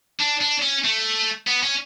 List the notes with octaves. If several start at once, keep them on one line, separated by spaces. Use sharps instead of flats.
D4
D4
C#4
A3
B3
C#4